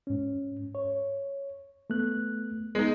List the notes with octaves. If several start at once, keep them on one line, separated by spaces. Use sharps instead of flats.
G#2 C#4
C#5
A3 B3 F#6
G#3 B3 D#4